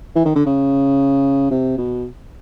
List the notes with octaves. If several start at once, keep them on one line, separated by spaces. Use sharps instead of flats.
E3
D#3
D3
C#3
C3
B2